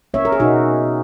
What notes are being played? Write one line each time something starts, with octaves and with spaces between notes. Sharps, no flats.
A#3 C#4 C#5 E5
A#4
G#4
B2 D#4 F#4